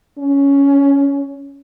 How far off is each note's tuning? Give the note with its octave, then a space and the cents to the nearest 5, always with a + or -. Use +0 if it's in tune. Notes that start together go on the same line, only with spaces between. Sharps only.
C#4 +10